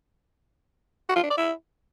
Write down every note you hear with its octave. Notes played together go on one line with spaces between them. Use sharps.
F#4
F4
D4
D5
E4